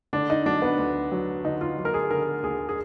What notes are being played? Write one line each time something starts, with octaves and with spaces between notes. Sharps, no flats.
D3 D4
D#4
F#3 D4
B3
D2
F#3
D3 D#4
F4
F#3
A#4
G#4
D3 A#4
D2 G#4
G#4